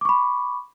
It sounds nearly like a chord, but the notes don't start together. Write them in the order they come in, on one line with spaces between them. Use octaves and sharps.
D6 C#6 B5